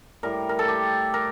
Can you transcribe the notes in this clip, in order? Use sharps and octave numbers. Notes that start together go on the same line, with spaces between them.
A2 G3 A#4
A#4
A4
G4
A#4